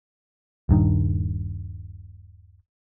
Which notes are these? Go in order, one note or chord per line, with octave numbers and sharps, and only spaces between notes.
D#1 G2 D#3